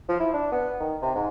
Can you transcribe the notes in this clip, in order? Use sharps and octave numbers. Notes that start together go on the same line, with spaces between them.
F3
E4
D4
B3
D#3
C3
G#2